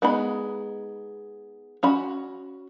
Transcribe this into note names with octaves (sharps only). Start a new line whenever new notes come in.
G#3 B3 D#4 B5
C#4 F#4 B5